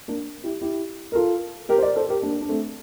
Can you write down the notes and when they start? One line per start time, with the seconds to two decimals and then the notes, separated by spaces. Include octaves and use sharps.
0.08 A#3 D4
0.44 E4 G4
0.61 E4 G4
1.12 A#4
1.15 F4 A4
1.69 G4 A#4
1.78 C5
1.82 A#4 D5
1.96 A4 C5
2.09 G4 A#4
2.22 A#3 D4
2.41 D4
2.49 A3 C4